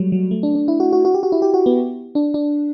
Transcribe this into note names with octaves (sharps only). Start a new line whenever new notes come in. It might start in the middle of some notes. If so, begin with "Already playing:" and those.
Already playing: F#3 G3 A3
F#3
A3
D4
D4
E4
F#4
F#4
F#4
G4
F#4
E4
G4
F#4
B3
D4
D4